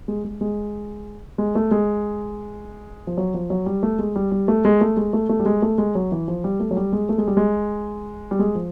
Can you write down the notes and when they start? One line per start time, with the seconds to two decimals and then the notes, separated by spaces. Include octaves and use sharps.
0.08 G#3
0.24 G#3
0.41 G#3
1.38 G#3
1.55 A3
1.71 G#3
3.07 F3
3.17 F#3
3.34 F3
3.50 F#3
3.66 G3
3.83 A3
3.99 G#3
4.16 G3
4.31 G3
4.48 A3
4.65 G#3
4.81 A3
4.97 G#3
5.13 A3
5.29 A3
5.40 G3
5.45 G#3
5.62 A3
5.78 G#3
5.95 F#3
6.12 E3
6.28 F3
6.44 G3
6.60 A3
6.71 F#3
6.77 G3
6.93 G#3
7.09 A3
7.18 G#3
7.27 G3
7.37 G#3
8.31 G3
8.39 G#3
8.55 F3